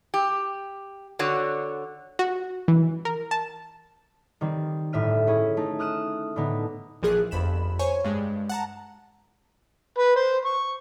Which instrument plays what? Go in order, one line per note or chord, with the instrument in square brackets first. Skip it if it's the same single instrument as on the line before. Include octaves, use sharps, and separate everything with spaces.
[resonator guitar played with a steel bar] G4
D3 F#4 C#5
[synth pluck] F#4
E3
A#4
A5
[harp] D#3 G3 C4
G1 A2 E5 F6 D#7
C#4 E4 G#4
A3 D#4
D#6 F6 F#6 D#7 E7
A2 D3 A3 B3 D#4
[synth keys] A#1 E3 F3 G#4 F#6
G1 F2 B5 E7
C5 C#5 G#5 C#6
G2 G#3
F#5 A5 A#5
[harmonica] B4
C5
C#6